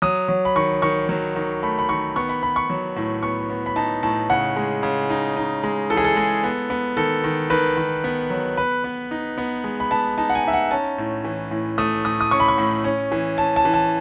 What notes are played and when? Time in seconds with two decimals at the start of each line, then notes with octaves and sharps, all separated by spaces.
0.02 F#3 D#6
0.28 F#3
0.45 B5
0.56 D#3 C#6
0.82 D#3 C#6
1.09 F#3
1.36 D#3
1.63 A3 B5
1.79 B5
1.89 D#3 C#6
2.16 B3 C#6
2.29 B5
2.43 B3 B5
2.56 C#6
2.70 F#3
2.96 A2
3.23 B3 C#6
3.49 B3
3.66 B5
3.76 D#4 A5
4.03 A2 A5
4.30 C#3 F#5
4.56 G#3
4.83 C#3
5.10 D#4
5.37 D#4
5.63 G#3
5.90 E3 A4
5.97 G#4
6.05 A4
6.17 G#3
6.43 B3
6.70 B3
6.97 D#3 A4
7.24 D#3
7.50 D#3 B4
7.77 D#3
8.04 B3
8.30 F#3
8.57 B3 B4
8.84 B3
9.11 D#4
9.38 B3
9.64 G#3
9.80 B5
9.91 B3 A5
10.18 D#4 A5
10.30 F#5
10.35 G#5
10.44 D#4 E5
10.53 F#5
10.71 C#4 A5
10.98 A2
11.24 E3
11.51 A2
11.78 A3 D#6
12.05 A2 D#6
12.21 D#6
12.31 C#4 C#6
12.40 B5
12.48 C#6
12.58 A2
12.84 C#4
13.12 E3
13.38 C#4 A5
13.56 A5
13.65 E3
13.74 A5